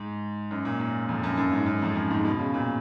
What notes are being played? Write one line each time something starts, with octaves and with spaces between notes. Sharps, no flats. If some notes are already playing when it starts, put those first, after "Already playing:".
Already playing: G#2
F#2
A#2
A#2
F2
F#2
F#2
G#2
F#2
F2
F#2
G#2
B2
C#3
A#2